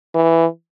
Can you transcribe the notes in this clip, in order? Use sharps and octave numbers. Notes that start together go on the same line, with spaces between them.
E3